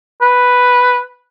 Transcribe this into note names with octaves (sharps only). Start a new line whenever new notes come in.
B4